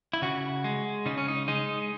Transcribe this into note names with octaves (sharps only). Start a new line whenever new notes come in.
E4
C#3 F#4
G#3
C#3 D#4
C#4
D#4
G#3 D#4